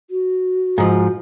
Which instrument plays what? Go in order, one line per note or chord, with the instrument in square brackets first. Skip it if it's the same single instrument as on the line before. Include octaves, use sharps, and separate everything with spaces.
[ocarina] F#4
[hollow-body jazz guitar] G#2 F3